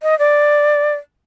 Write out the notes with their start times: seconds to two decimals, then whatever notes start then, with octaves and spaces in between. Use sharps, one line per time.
0.03 D#5
0.19 D5